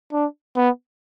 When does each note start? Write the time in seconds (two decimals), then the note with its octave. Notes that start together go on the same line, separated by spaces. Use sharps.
0.12 D4
0.56 B3